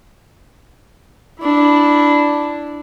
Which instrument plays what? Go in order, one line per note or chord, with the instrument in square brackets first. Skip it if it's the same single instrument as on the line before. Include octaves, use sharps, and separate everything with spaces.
[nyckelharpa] D4 E4